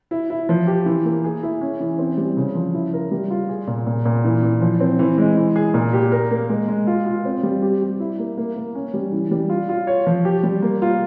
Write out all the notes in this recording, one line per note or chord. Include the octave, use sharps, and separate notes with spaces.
E4
E4
F3
G4
E3
A#3
G#4
E4
C#4
E3
C4
G3
C#3
F3
E4
A#4
G3
F4
G#4
A#2
A#2
A#2
E3
E3
F3
C4
E3
G#3
E3
G#4
A#2
G4
A#4
A#3
G#3
G#3
F4
F4
C4
G3
G4
G4
E4
A#3
A#3
A#3
C#4
G3
E3
G3
F4
F4
C#5
F3
G4
G3
A#3
F4